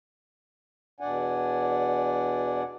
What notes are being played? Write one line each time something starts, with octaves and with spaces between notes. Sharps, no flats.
E2 B2 D4 D5 F#5 G#5